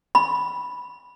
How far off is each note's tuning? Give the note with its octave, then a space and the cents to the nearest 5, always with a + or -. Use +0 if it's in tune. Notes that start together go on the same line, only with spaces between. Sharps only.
B5 -5